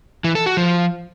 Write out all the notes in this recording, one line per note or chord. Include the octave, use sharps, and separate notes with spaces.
E3
A4
F#4
F3